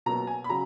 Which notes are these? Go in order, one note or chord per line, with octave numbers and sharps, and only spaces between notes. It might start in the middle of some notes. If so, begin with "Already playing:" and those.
B2 F#3 A#3 A#5
G#5
B5
C#3 F#3 A#5